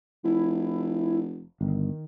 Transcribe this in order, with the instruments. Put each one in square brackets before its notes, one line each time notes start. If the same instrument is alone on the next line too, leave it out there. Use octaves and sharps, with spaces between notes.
[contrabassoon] F1 [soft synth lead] E4
[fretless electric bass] G1 [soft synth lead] D#3